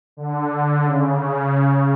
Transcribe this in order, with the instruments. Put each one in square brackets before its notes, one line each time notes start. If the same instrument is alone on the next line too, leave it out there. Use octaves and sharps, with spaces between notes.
[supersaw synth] D3
D3
C#3